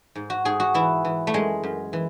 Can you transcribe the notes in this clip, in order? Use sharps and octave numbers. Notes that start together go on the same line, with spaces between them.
G#2
F#4
G#2 G#4
F#4
E3 E4
E3
A3
F#2 G#3
F#2
E3